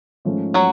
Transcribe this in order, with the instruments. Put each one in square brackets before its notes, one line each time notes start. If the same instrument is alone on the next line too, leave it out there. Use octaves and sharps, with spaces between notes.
[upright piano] G#2 F3 A3 C#4
[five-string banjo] F#3 F#4